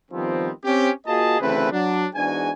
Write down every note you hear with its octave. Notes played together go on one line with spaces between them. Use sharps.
D#3 F3 G3 B3 C4
C4 C#4 G4
A#3 F4 F#4 G#4 D#5 A5
D2 C#3 E3 A3 C4 B4
F#3 D4
E2 G#2 D4 F#4 G#5